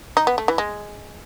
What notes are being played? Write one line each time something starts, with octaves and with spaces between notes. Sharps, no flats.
D#4
B3
A3
E3
G#3